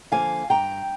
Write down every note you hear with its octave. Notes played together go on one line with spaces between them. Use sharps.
D3 F3 A#3 F5 G#5
G2 G5 A#5